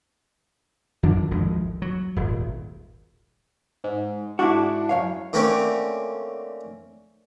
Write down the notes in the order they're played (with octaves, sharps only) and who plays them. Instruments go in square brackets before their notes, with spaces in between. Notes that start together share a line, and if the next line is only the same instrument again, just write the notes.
[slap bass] F2 D#3 F#3 D4
G#1 D2 F3 G#3
F#3
D#1 G#1
[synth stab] G#2
[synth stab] G#2 D4 [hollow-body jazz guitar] E4 F#4
[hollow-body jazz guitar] F#2 C#5 F5
[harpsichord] D3 A3 A#3 C4 C#4